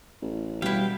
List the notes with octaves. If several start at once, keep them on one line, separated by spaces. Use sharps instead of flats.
A1
B2 G3 E4 F5 G5